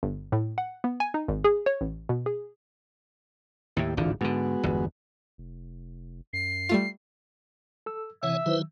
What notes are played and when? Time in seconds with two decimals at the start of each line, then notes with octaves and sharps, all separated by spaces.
0.03 G1
0.32 A2
0.58 F#5
0.84 B3
1.00 G#5
1.14 D#4
1.28 G#1
1.44 G#4
1.66 C#5
1.81 A1
2.09 B2
2.26 G#4
3.77 D#2 A2 E4 G4
3.97 D1 G#1 D3 E3 D4 F4
4.21 G#2 D3 G#3 B3 F#4
4.63 G1 E2
5.38 F1
6.33 F#2 C7
6.69 G3 A3 F4
7.86 A4 E6
8.23 C3 E3 C#5 E5 F#5 G#5
8.46 D#3 F#3 E4 B4 C5